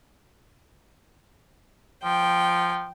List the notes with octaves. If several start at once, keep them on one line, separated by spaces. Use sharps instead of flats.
F3 G5